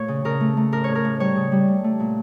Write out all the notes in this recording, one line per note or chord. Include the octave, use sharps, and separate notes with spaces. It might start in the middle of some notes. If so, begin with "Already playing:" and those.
Already playing: A#2 A3 C#5
C#3
C#3 A#4
A3
A3
A2 A#4
A2 C#5
A#4
A2
G3 C#5
C#3
G3
A3
A3
A#2